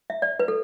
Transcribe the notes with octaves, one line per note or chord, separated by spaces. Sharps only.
E5
D5
B4
A4